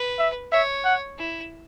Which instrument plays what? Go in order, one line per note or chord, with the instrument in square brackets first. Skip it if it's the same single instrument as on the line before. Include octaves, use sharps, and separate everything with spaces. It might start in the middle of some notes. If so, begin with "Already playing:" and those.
Already playing: [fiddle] B4
[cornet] E5
[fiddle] C#5 [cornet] E5
[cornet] F#5
[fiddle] E4